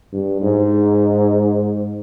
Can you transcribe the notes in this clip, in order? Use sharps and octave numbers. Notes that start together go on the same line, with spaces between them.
G2
G#2